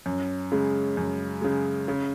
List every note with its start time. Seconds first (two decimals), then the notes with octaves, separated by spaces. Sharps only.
0.06 F#2
0.52 C#3 G#3
0.97 F#2
1.41 C#3 G#3
1.88 C#3